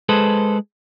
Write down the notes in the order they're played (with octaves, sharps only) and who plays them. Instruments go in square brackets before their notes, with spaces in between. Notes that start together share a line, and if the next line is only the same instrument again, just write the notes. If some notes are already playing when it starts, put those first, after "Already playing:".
[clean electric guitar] G#3 G#4 A4 B4 C5